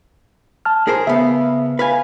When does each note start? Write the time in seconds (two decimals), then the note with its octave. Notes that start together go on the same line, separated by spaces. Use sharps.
0.65 A5 F6
0.87 G#4 A#4 C5
1.07 C#3 B3 E5
1.79 B4 F5 G#5